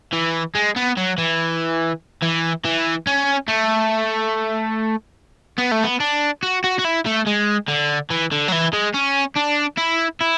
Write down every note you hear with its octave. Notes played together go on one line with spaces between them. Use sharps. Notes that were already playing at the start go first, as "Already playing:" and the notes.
E3
G#3
B3
F#3
E3
E3
E3
C#4
A3
B3
A3
B3
D4
F#4
F#4
F#4
E4
A3
G#3
D3
E3
D3
F#3
E3
G#3
C#4
D4
E4
E4